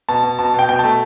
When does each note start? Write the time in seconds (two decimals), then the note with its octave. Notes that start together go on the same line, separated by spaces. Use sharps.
0.09 B2 A5
0.23 B2
0.39 B2 A5
0.54 B2 G5
0.69 B2 G5
0.79 A3 A5